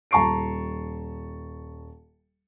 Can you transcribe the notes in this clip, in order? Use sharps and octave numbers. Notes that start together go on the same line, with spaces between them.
D#1 A5 A#5 C#6 C7 D7